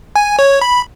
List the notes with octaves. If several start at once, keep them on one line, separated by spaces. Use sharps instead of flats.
G#5
C#5
B5